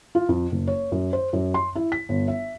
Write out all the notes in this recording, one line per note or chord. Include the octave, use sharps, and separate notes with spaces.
F4
F2
F#1
C#5
F#2
C5
F#2
C6
E4
B6
G1
E5